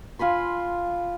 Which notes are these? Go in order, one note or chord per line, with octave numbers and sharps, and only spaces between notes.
F4 G#5 B5 C6